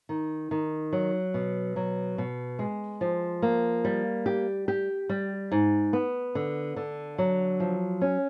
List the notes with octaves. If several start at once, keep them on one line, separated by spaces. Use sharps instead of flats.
D#3
D#3
F#3
B2
F#3
B2
G#3
F3
A#3
G3
G4
G4
G3
G#2
B3
D3
D3
F#3
F3
C#4